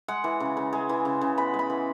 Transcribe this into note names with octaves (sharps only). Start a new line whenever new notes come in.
G#3 F#5
E3
C#3
C#3
G#3
E3
C#3
C#3
B3 B5
G#3
B5
E3